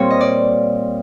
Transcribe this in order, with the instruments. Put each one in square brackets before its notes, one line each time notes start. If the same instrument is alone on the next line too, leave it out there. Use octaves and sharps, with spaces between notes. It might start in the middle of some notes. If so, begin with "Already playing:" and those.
Already playing: [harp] A#2 G3 C4 C#5
D#5
D5